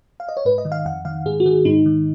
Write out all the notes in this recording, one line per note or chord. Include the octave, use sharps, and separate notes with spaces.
F5
D#5
C#5
G#2 B4
D#5
D#3
F5
F2 F#5
D#3 F5
G#2 G#4
F#4
D#3 G#4
G#2 D#4
D#3